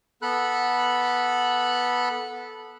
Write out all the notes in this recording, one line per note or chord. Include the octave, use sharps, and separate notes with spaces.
B3 A4 B5 F#6